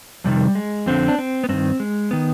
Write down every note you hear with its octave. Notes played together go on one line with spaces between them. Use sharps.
F2 C3 D#3 G3
G#3
F2 D3 C4
D4
C4
B3
G2 D#3 C4
G#3
D#3 B3